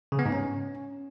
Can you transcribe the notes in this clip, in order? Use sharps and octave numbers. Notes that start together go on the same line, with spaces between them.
C#3
B3
G#2
C#4